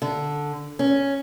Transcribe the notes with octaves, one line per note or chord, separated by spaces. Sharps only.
D3
C#4